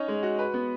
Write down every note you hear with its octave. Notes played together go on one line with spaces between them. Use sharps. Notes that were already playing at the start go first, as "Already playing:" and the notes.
Already playing: C#4 D#4 C#5
G#3
F#4
B4
B3